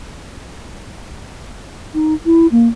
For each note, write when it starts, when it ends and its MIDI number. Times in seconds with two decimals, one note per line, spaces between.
1.94 2.14 63
2.26 2.47 64
2.52 2.68 58